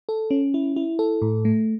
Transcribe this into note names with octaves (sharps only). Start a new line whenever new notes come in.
A4
C#4
E4
E4
A4
A2
A3